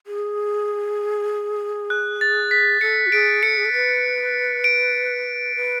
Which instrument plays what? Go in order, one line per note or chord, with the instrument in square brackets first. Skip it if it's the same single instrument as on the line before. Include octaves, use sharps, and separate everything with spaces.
[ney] G#4
[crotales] F#6
A6
B6
[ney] A4 [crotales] C#7
[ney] F#4
[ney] G#4 [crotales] D7
[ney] A4 [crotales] C#7
[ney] G#4
A4
B4
[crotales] D7
[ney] B4